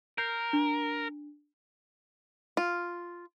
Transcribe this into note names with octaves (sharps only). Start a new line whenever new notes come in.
A#4 G6 C7
D4
F4